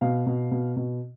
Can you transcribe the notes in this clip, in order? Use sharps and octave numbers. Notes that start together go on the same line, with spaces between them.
B2 F5
B2
B2
B2